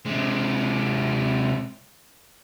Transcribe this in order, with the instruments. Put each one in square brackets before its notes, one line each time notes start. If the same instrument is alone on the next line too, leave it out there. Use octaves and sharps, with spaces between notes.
[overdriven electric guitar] C3 G#3